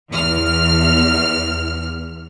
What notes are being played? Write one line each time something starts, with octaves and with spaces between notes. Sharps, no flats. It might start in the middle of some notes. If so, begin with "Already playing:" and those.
E2 F6